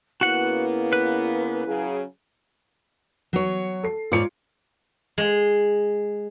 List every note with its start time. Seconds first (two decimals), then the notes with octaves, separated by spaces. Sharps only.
0.21 C#3 A#3 B3 E4 F#4 F#5
0.93 B4
1.66 C#3 F#3 G#4
3.33 F#3 C#5
3.83 A4 C7
4.12 G#2 F4 C#5 D5 C#7
5.18 G#3